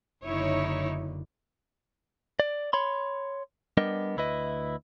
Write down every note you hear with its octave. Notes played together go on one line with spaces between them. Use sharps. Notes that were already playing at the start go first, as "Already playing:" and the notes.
F#1 D3 D#4 E4 C#5
D5
C#5 B5 C6
G3 B3 D4 A#4 D#5
D2 E4 B4 D#5